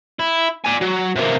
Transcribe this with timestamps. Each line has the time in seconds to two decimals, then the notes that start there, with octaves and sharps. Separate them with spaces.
0.19 E4
0.65 D5 G#5
0.81 F#3
1.16 C3 A#3